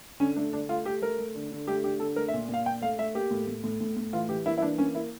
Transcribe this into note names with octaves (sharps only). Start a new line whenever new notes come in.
D3 C#4
A3 D4
D3 D4
A3 F4
A3 G4
A3 A#4
A3
D3
D3
A3 G4
D3 G4
D3 A4
A3 A#4
E5
A#2
A#2 F5
A#2 G5
A3 F5
A3 E5
A#3 G4
A2
A2
A2
A2
A2
E3 F4
E3 G4
A#3 E4
E4
E3 D4
A#3 C#4
A#3 E4